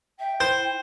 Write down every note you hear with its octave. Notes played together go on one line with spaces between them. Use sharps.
E5 G5
E4 C5 G6